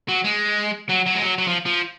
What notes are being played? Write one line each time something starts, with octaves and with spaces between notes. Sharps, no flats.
F#3
G#3
F#3
F#3
G#3
F#3
F#3
F3
F3